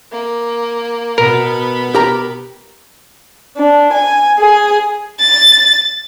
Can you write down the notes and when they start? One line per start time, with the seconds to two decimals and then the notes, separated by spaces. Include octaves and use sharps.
0.11 A#3
1.18 B2 B3 A#4 B5
1.95 G4 A#4 A#5
3.57 D4
3.92 G#5
4.37 G#4
5.20 A6